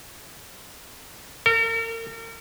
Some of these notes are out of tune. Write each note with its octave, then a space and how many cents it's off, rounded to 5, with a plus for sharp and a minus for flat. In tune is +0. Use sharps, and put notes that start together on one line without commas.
A#4 -40